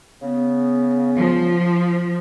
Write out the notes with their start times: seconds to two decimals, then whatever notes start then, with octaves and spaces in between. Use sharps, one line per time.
0.22 C#3 B3
1.16 F3